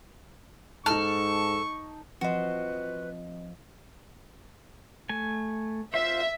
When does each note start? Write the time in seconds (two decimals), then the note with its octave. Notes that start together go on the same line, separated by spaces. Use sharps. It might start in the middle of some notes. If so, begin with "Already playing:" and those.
0.86 G#2 D#4 A4 A5 C#6 F6
2.21 F3 C4 F#4 B4 C5 D#5
5.09 A3 G#5
5.94 F4 C5 E5